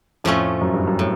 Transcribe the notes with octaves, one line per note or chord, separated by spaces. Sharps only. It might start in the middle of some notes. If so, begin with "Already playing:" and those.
F2 A2 F3 A3 C#4
F#2
G2
F#2
A2